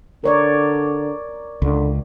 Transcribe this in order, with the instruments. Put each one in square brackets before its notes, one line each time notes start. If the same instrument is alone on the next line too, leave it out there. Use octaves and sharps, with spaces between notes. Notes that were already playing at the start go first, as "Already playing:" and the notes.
[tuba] D3 [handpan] A#4 C#5 D5
[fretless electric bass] C#2 [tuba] D3